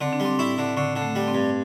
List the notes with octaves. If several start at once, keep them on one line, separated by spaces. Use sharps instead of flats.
D3 C4
D4
G3 C4
A2 E4
D3
A2 D3
D3
A3
G3
C4
G2